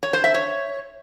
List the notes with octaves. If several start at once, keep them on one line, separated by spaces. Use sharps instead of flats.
C#5
C5
E5
C#5